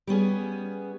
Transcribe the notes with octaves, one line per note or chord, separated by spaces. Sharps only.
G3 B3 C#4 G#4